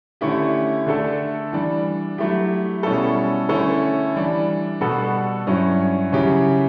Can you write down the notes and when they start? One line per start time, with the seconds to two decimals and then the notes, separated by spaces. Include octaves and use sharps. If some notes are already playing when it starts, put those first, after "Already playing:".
0.21 D3 A3 C#4 E4 G4
0.86 D3 A3 D4 A4
1.53 E3 G3 D4
2.18 F#3 A3 E4 G4
2.83 B2 G3 C#4 E4 A4
3.49 D3 A3 C#4 E4 A4
4.15 E3 G3 D4
4.81 B2 G3 B3 F#4 A4
5.46 G2 F#3 C#4 E4
6.12 C#3 F#3 C#4 E4 G4